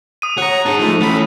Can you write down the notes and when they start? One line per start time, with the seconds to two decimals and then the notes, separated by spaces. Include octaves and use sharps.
0.22 D#6 D#7
0.38 C#5 F#5 A#5
0.66 D#4 G#4 A5
0.79 F3 A3
1.01 E3 A3 C#4 B5